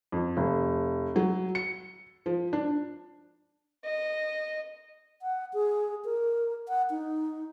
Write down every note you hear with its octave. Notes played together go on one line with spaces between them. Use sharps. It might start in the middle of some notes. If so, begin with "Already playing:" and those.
F2
F1
F#3
C#7
F3
D4
D#5
F#5
G#4
A#4
F#5
D#4